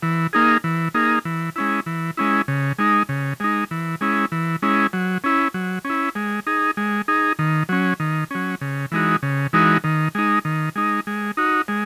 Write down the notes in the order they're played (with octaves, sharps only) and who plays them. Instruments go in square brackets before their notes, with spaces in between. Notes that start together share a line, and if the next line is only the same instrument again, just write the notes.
[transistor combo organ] E3
A#3 D#4 G#4
E3
A#3 D#4 G#4
E3
G#3 C#4 E4
E3
G#3 C#4 E4
C#3
G#3 D#4
C#3
G#3 D#4
E3
G#3 C#4 E4
E3
G#3 C#4 E4
F#3
C#4 E4
F#3
C#4 E4
G#3
D#4 G#4
G#3
D#4 G#4
D#3
F#3 C#4
D#3
F#3 C#4
C#3
E3 G#3 D#4 F#4
C#3
E3 G#3 D#4 F#4
D#3
G#3 D#4
D#3
G#3 D#4
G#3
D#4 F#4
G#3